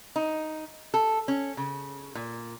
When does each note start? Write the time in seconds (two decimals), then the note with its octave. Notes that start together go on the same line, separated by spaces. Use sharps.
0.16 D#4
0.94 A4
1.28 C#4
1.57 C#3
2.15 A#2